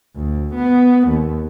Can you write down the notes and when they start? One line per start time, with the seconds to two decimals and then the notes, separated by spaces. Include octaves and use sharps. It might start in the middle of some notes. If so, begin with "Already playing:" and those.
0.16 D2
0.55 B3
1.08 D#2